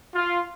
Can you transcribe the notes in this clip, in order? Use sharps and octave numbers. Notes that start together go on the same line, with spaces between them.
F4